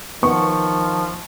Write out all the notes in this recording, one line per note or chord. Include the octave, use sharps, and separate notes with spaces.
D#3 F3 B3 C#6